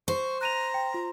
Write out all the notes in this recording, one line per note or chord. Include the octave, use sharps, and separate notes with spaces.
C5 C#6
A#5 F#6 D#7 F7
G5
F4